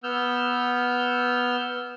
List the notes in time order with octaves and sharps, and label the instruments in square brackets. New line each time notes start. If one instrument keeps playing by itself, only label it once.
[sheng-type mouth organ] B3 E6 F6 G6